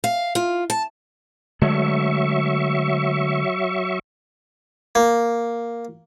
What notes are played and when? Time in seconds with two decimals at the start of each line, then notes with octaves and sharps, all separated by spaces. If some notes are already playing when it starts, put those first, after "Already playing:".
0.04 F5
0.35 F4
0.70 A5
1.62 D3 F#3 G#3 A3 E5 C#6
4.95 A#3